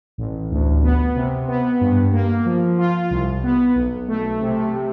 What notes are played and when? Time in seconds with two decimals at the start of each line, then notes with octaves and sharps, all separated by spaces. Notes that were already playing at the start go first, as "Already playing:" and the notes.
0.18 A1
0.51 D2
0.83 B3
1.16 C3
1.48 B3
1.81 G2
2.13 A#3
2.46 F3
2.78 F4
3.10 C2
3.43 B3
3.76 B1
4.08 A3
4.41 C3
4.73 C3